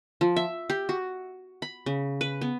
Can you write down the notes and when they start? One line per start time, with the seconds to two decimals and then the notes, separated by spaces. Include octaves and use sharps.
0.21 F3
0.36 E5
0.70 G4
0.89 F#4
1.62 B5
1.86 C#3
2.21 B4
2.41 B3